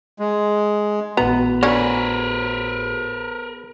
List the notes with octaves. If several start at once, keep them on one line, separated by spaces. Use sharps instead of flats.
G#3
G#1 A2 B3 F#4 A#5
D3 C#4 A#4 B4